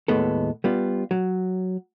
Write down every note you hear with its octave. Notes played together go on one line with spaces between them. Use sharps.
D#2 A2 G#3 B3 A4
G3 B3 F4
F#3